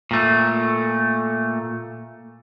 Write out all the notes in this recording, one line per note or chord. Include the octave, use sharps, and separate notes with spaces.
A#2 A3